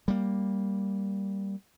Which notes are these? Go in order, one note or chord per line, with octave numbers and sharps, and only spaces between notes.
G3 A#3